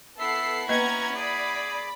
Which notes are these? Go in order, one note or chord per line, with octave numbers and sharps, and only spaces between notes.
B3 E4 A4 E5 F#5 C7
A#3 B3 C#4 B4 D#5 A#5 G#6
G#4 D5 B5